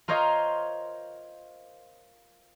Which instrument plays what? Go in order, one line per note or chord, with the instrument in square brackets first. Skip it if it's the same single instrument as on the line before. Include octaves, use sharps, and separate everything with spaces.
[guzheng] F4 A#4 C5 C#5 D#5 F5